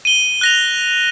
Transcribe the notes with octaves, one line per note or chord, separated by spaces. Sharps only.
D#7 G7
F#6 A#6 F7